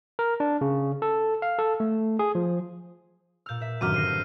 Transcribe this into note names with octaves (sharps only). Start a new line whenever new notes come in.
A#4
D4
C#3
A4
F5
A4
A3
G#4
F3
A#2 E6 F6 G6
A#4 E5
G1 F#2 D#3 A#5 D6 F6 D#7
D3 C4 A#6 C7 D#7
D#7